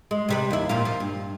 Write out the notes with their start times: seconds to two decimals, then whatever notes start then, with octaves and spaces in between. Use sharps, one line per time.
0.11 G#3
0.29 C3 G3 B4
0.51 D#2 E4
0.69 A#2 F3 F4
0.85 F3
1.00 G2